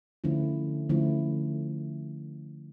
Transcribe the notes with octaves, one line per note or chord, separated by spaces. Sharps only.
D3 F3 A3 C#4 E4
D3 F3 A3 C#4 E4